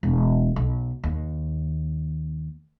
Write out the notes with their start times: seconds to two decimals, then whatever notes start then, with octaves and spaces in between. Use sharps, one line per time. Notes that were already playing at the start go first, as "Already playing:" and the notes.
0.03 E1
0.56 B1
1.04 D#2